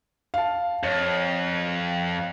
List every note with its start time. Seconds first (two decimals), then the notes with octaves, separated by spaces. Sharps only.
0.34 F5 A5
0.83 F2 C#5